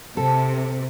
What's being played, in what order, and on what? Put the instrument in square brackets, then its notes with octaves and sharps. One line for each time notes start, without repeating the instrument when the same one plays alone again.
[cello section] C3 [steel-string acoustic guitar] A4